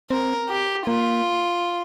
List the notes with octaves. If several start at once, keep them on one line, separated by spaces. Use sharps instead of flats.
C4 A#4
G4
A#3 F4